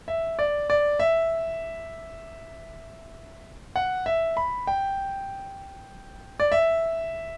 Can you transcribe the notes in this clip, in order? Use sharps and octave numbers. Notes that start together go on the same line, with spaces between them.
E5
D5
D5
E5
F#5
E5
B5
G5
D5
E5